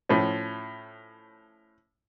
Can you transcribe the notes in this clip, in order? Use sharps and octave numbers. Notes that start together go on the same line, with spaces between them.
A2 F3 C#4